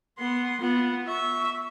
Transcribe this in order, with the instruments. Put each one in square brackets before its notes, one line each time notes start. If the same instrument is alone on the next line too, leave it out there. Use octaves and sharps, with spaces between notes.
[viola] B3 C6
[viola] B3 [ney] F4
[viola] E5 [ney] C#6